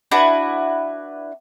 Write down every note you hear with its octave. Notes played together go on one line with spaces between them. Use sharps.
D4 E4 F#4 B4